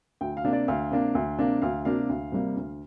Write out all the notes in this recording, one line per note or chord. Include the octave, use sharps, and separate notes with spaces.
D2 G5
F5
C3 A#3 D4
D5
D2 F5
C3 A#3 D4
D2
C3 A#3 D4
D2 F5
C3 A#3 D4 F5
D2
C3 G3 A#3
D2